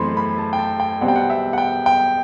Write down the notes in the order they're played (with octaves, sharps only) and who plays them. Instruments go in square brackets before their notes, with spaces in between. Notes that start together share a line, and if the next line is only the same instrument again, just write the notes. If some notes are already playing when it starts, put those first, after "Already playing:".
Already playing: [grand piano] F#2 E3 A3 C4 B5 C6
B5
A5
G5
A5
G5
B2 G3 C4 F#5
G5
F#5
E5
F#5
G5
G5